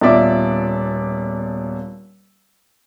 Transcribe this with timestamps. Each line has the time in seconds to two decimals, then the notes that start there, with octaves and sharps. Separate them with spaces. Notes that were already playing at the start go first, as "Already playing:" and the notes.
0.01 D#1 B2 F4 D5 E5 D6